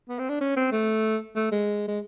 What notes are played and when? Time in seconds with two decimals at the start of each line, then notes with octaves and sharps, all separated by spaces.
0.09 B3
0.19 C4
0.29 D4
0.41 C#4
0.56 C4
0.72 A3
1.36 A3
1.51 G#3
1.88 G#3